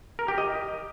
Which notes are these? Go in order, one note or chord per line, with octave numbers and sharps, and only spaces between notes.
A#4
G4
D#5